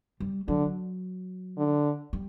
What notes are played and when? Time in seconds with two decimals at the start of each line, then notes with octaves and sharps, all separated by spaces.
0.20 G3
0.48 D3 F#3
1.57 D3
2.13 G3